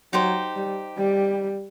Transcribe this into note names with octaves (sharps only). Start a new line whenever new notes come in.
F#3 D#4 G4 C5
G3
G3